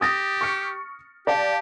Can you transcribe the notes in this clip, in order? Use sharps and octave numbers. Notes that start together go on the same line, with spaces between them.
G4 D#6 A6 A#6
C#6 F6 C#7
G4 D5 F5 A5